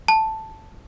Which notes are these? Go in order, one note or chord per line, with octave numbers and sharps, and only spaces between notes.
A5